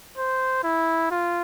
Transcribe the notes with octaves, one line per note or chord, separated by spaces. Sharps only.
C5
E4
F4